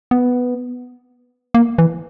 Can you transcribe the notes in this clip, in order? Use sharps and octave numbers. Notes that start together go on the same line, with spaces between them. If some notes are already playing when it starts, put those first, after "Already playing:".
B3
A#3
E3